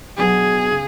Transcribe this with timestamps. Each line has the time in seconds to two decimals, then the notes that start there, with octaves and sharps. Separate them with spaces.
0.17 B2 F#3 B3 D4 G#4
0.72 C#3